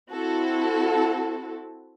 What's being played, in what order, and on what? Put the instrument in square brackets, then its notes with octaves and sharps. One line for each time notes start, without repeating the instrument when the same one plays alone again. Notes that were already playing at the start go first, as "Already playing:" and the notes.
[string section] C4 E4 F#4 A4